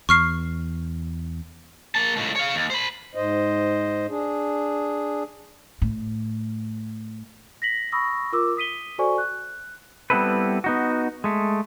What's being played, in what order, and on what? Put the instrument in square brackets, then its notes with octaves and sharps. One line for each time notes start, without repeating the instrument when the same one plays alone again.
[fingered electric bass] E2 [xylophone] C#6 F6 C7
[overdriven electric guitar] A#3 A5
C#2 A2
C#5 F5
D#2
C5 B5
[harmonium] G#2 C5 D#5
D4 G#4
[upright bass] A2
[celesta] A#6 B6 F#7
B5 C#6 D#6 E6 A#6
F4 A#4 D6 E6
D#6 B6 D#7 G7
F#4 A4 C5 D5 G#5 C#6
F#6
[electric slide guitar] G3 B3 C4 E4 A4 B4
B3 D#4 F#4
G#3 A3